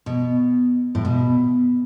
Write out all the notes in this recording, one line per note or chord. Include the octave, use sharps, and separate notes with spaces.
B2
A2
B2